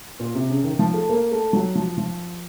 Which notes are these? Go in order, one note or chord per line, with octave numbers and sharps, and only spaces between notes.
A#2
C3
C#3
D#3
D#3
F3
A3
A#3
A3
F#3
F3
F3